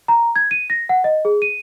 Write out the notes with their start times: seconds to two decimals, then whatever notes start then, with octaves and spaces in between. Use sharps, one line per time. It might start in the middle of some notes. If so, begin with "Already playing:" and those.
0.08 A#5
0.36 G#6
0.51 D#7
0.70 A#6
0.89 F#5
1.04 D#5
1.25 G#4
1.42 D#7